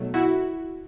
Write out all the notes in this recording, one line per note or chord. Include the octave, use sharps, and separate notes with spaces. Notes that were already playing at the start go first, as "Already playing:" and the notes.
Already playing: B1 B2 F#3 A3
E4 F#4